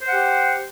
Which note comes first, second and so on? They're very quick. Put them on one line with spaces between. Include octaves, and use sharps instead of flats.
C5 F#5 G4